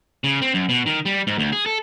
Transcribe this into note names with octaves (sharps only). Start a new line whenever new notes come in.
C#3
C4
F#2
B2
D#3
G3
G#2
D2
G#4
A4